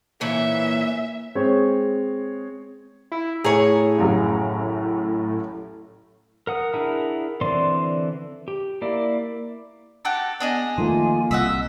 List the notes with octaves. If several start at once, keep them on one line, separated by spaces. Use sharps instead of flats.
A#2 E3 A#3 C#4 E5
G#3 C4 C#5
E4
A2 E4 G#4 C#5 A#5
A1 F#2 C#3
A#4 F#5 D#6
D4 E4 G#4 A#4 F#5
D3 E3 C4 D5 C6
G4
A#3 E4 D5
F#4 G4 A4
B3 D4 G#4 D#5
D#3 F3 A3 A#3 F4 G#5
C2 F#4 D#5 E5 E6